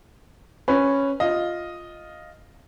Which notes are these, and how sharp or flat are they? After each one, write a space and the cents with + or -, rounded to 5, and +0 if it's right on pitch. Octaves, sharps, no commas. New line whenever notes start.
C#4 -5 B4 +5
F4 +0 D#5 +0